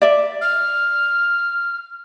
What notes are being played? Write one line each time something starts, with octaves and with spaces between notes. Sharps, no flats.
D5 E5
F6